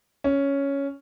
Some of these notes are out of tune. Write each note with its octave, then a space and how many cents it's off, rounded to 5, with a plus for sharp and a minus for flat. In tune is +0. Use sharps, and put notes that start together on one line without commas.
C#4 +5